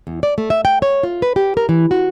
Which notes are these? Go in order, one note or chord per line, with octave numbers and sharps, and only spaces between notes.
E2
D5
A3
E5
G5
C#5
F4
B4
G4
A#4
E3
F#4